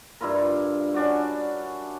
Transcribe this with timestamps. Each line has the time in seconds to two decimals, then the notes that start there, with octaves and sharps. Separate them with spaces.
0.21 G2 E4 F4 A#4
0.94 C#4 D4 F#4